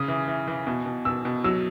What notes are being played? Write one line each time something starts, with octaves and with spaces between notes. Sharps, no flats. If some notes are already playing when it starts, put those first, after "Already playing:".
Already playing: C#3 D#6
E3
E3
E3
B2
B2
B2 E6
B2
F#3 E6